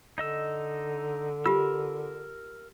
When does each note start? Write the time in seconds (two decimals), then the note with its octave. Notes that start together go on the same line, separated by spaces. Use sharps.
0.18 D3 D#4 D#5 E6
1.46 F4 G4 A#4 E6